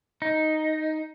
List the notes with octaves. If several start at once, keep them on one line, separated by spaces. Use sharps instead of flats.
D#4